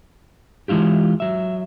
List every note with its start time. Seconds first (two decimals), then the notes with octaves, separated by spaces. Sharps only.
0.68 E3 G#3 E4 F4 G4
1.20 F#3 E5